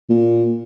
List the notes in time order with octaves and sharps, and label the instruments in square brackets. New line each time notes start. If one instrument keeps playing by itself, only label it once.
[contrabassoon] A#2